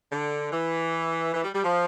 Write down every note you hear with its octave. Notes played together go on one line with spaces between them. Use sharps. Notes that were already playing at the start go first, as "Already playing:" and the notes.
D3
E3
E3
G3
G3
F3